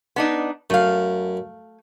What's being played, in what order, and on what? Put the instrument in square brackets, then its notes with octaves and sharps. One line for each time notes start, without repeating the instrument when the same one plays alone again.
[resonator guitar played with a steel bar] B3 D4 D#4
[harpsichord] F#2 [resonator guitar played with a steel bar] A3 F5